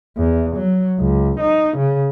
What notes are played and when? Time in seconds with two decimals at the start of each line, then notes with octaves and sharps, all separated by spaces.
0.17 E2
0.56 F#3
0.99 C#2
1.40 D#4
1.77 C#3